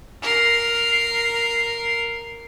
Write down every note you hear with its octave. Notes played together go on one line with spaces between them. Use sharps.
A#4 C7